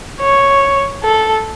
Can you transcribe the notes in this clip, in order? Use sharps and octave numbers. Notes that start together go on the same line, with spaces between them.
C#5
A4